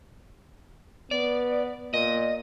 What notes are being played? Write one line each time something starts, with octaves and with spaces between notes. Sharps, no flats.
B3 D5
A#2 D#5